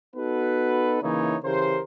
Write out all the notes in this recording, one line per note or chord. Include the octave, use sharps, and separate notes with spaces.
B3 D#4 F#4 A4 B4
C#3 E3 A#3 D#4 E4 C#5
C#3 E3 G4 A#4 C5